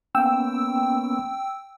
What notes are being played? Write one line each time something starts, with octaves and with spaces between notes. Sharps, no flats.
A#3 B3 C#4 G5 E6